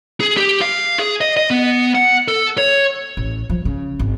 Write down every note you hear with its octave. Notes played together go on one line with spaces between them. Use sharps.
G#4
G4
F5
G#4
D#5
D#5
B3
F#5
A4
C#5
A1
F3
C#3
G#1